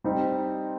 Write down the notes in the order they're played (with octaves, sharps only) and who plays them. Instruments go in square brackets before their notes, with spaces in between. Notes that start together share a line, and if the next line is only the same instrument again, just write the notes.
[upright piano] G3 C4 D#4